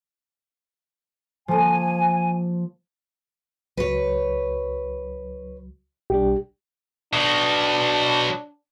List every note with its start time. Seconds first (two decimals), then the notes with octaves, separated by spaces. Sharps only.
1.48 F3 A#3 G#5
3.77 C#2 F#3 B4 C#5
6.10 B1 G3 D4 G4
7.13 B2 F#3 D4